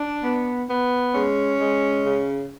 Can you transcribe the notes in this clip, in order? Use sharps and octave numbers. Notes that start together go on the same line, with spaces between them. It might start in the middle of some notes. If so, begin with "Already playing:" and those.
Already playing: D4
B3
B3
G#3 C#4
G#3
C#3